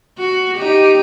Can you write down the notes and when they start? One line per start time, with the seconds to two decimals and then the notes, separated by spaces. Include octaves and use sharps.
0.18 F#4
0.58 D#4 G4